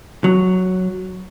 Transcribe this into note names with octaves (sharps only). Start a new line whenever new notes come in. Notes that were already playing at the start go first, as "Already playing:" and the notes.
F#3